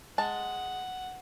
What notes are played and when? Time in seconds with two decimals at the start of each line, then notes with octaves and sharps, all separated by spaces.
0.18 G#3 F#5 A5